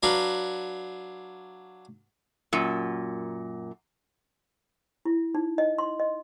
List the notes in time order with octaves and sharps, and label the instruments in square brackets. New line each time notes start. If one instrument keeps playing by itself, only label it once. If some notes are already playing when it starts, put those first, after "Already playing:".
[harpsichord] F#3 D4 F#4 B4 F5
[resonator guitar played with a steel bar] F#2 A#2
[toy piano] E4
D#4
D#5
C6
D#5